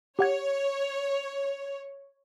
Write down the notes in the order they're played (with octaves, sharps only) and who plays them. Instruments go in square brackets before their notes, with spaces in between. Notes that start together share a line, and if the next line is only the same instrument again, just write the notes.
[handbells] G4 F#5 G#6 [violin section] C#5